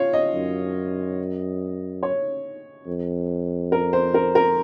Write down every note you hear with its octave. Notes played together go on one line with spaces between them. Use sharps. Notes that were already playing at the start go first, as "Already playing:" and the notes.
Already playing: F4 C#5
D#5
F#2
C#5
F2
A#4
C5
A#4
A#4